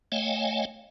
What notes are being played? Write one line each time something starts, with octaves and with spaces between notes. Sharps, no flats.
A3 C#5 D#5 F5 G5 G#5